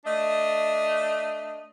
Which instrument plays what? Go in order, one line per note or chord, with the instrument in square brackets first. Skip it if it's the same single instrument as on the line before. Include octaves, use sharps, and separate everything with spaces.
[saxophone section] A3 D4 D#5